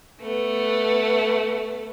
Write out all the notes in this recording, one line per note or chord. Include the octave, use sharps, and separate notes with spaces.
A3 B3